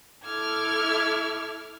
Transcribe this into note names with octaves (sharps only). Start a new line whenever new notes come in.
E4 A4 D6 F6 G#6